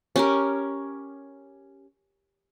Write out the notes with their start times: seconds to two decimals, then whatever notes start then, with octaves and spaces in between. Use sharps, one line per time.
0.16 C#4 G4 A#4